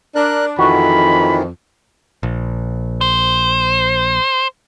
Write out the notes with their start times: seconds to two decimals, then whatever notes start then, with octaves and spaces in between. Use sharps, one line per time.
0.16 D4 A#4 F#6
0.59 F2 D#3 E3 F#4 B5
2.23 A#1
3.01 C5